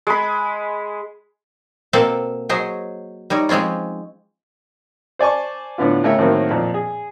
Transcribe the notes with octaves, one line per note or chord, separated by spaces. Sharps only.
G#3 B5
B2 A#3 C4 A4 F5
F#3 G#4 C5 C#5 D#5
G3 D#4 C#5
F3 G#3 C4 C#4 F4
C5 D5 G#5 A5 C#6
A2 D3 B3 F4
C#3 A3 A#4 C#5 E5 G5
A2 D#3 F#3 A#3 C4 E4
F2 A#2 C4
G#4